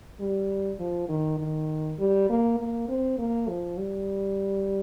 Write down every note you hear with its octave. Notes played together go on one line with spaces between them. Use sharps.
G3
F3
D#3
D#3
G3
A#3
A#3
C4
A#3
F3
G3